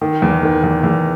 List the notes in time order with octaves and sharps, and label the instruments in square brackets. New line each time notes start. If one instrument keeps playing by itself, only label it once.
[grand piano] D#3
E2
D#3
E2
E2